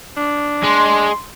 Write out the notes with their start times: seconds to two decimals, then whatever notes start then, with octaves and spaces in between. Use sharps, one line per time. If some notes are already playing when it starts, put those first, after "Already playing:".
0.17 D4
0.64 G#3 C6